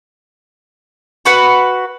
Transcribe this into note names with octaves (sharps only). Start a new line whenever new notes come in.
F#4 B4 F#5